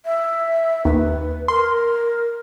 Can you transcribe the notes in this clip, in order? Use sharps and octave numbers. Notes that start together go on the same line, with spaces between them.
E5
D#2 B4
A#4 C6